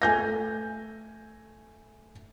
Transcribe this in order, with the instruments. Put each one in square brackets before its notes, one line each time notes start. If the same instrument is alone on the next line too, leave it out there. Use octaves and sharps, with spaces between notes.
[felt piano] A3 G#5 G6 A#6